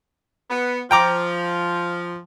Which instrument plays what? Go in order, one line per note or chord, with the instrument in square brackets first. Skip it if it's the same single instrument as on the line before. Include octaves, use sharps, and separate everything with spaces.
[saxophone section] B3
[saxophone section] F3 [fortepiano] G5 A#5 D6